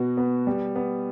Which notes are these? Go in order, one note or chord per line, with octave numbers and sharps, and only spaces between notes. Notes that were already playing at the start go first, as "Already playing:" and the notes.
Already playing: B2 B3 F#4
B3
G3
B3